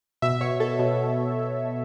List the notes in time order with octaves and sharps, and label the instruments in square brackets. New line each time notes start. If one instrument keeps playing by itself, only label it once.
[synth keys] B2 E5
B2 C#5
B2 A4
B2